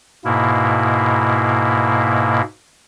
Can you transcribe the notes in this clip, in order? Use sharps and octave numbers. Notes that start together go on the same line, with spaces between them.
G#2 B2 A#3 E4